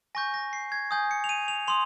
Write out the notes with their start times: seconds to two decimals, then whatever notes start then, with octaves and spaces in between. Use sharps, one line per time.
0.15 G#5 C#6 G6 A#6
0.34 A#6
0.53 C7
0.72 G#6
0.91 G#5 D#6 G6
1.11 C#7
1.24 F7
1.29 D#7
1.48 F7
1.67 C6 D#6 F7